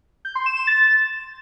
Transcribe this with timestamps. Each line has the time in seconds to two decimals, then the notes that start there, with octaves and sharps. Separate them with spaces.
0.25 G6
0.35 C6
0.46 E7
0.57 E7
0.67 A6